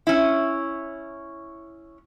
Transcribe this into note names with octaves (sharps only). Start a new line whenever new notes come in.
C#4 E4